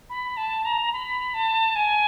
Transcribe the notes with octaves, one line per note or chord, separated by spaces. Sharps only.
B5
A5
A#5
B5
A5
G#5